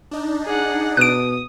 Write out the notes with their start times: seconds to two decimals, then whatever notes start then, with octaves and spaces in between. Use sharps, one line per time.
0.11 D4 D#4
0.46 G#4 F#5
0.97 B2 D#6 F#6 D7